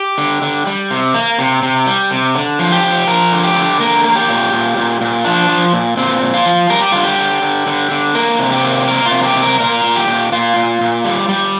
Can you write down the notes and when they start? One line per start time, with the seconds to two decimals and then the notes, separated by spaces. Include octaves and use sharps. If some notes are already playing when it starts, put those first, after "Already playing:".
Already playing: G4
0.18 D3
0.42 D3
0.67 G3
0.90 C3
1.14 A#3
1.38 C3
1.63 C3
1.87 G3
2.11 C3
2.35 D3
2.59 F3
2.72 G4
2.83 F3
3.07 F3 A#4
3.32 D3
3.44 G4
3.56 D3
3.80 A#3 A#4
4.04 A#3
4.16 G4
4.29 A#2
4.52 A#2
4.77 A#2
5.01 A#2
5.25 F3 D4
5.49 F3
5.73 A#2
5.97 A#2 C4
6.22 A#2
6.34 F4
6.45 F3
6.70 G3 A#4
6.81 G4
6.92 D3 F4
7.04 G4
7.19 D3
7.42 D3
7.67 D3
7.91 D3
8.15 A#3 A#4
8.39 C3
8.52 G4
8.63 A#3
8.88 A#3 A#4
9.06 F4
9.12 C3
9.23 G4
9.36 C3
9.42 A#4
9.60 A#2 A#4
9.84 A#2
9.96 G4
10.08 A#2
10.32 A#2 F4
10.56 A#2
10.81 A#2
11.05 G3
11.29 G3